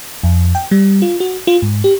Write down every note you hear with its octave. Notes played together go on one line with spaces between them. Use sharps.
F2
G5
G3
F4
F#4
F4
G#2
G4